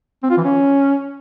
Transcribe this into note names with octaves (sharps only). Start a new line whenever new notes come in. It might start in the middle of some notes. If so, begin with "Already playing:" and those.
C4
F4
E3
C#4